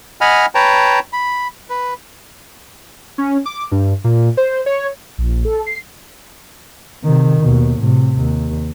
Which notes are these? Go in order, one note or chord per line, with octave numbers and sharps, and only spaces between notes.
D#5 F#5 G#5 B5 F6
B4 C#5 G5 A5 A#5
B5
B4
C#4
D6
G2
A#2
C5
C#5
A#1
A4
C7
C3 D#3
D#2 B2
A2 C3
D#2